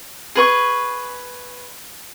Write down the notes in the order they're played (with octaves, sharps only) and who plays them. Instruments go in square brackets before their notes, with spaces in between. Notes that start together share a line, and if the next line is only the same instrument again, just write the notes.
[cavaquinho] G#4 B4 C#6